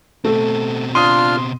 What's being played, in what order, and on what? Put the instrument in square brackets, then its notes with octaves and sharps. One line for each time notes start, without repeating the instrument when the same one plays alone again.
[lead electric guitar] B2 C4 [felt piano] A3 A4
[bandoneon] D4 F4 F6 [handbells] C6 [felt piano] D#6 D#7